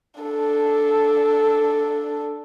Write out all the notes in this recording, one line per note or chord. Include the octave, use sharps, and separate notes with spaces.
D4 A4